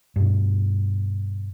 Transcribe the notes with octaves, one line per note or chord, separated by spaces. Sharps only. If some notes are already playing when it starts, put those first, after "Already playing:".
G2 B2